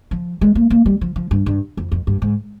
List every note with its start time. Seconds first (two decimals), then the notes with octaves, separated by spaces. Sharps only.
0.11 F3
0.41 G#3
0.55 A#3
0.70 A#3
0.86 G3
1.01 F3
1.16 F3
1.31 G2
1.46 G2
1.77 F2
1.92 F2
2.07 G2
2.22 G#2